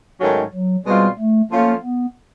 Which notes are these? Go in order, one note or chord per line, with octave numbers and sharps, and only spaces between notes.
G#2 D#3 F#3 A3 C#4
F#3
B2 G3 G#3 C4 F4
A3
F3 A3 A#3 C#4 F4
B3